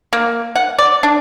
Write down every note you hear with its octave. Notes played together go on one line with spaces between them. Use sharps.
A#3
F#5
D5
D4